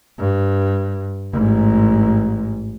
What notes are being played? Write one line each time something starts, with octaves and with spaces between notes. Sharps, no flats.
G2
A1 G#2